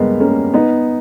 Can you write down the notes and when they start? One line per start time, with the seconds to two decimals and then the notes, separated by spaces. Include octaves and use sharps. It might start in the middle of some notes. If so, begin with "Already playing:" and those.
Already playing: G3 G#3 A#3 B3
0.20 A#3 C#4
0.54 B3 D#4